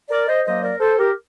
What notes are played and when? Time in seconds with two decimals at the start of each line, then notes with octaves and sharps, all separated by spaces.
0.11 A#4 D5
0.28 C5 D#5
0.46 F#2 F#3 A#3 C5 D#5
0.63 A#4 D5
0.80 A4 C5
0.98 G4 A#4